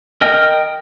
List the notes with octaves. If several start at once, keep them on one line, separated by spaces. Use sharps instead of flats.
A#4 D#5 G5 F6